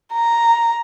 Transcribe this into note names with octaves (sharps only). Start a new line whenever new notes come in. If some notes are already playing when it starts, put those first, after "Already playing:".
A#5